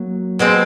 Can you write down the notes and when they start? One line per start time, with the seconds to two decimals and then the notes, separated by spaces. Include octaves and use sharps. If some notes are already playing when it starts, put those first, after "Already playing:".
Already playing: F#3 A#3
0.39 B2 G#3 C4